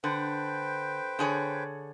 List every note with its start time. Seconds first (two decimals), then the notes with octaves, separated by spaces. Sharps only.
0.04 D3 B4 C5 G5
1.19 D3 G#4 C#5